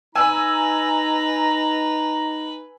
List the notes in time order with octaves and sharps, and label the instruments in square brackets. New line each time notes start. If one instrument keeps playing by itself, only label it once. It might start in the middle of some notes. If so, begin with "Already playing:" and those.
[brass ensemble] D#4 A#5 [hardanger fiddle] B4 [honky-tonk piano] G#5 E6